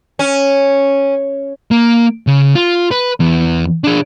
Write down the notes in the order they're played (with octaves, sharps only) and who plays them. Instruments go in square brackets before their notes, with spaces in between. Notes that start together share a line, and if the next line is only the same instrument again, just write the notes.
[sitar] C#4
[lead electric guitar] A#3
C#3
F4
B4
E2
D4 G#4